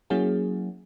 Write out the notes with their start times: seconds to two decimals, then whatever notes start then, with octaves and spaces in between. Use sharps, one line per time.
0.10 F#3 A#3 C#4 E4 F#4 G#4